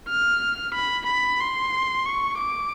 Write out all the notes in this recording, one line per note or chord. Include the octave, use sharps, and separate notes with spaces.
F6
B5
B5
C6
C#6
D6